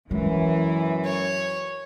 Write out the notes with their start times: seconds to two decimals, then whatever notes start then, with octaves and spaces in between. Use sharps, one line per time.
0.11 F#2 E3 G#3
1.05 C#5